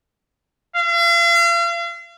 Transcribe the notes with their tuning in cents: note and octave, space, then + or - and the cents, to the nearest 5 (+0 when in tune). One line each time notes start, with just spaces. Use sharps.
F5 -40